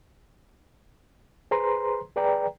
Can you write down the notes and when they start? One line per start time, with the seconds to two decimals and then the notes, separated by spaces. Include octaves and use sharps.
1.51 G#4 B4 C5 A#5 C6
2.16 G#4 B4 D5 G5 A#5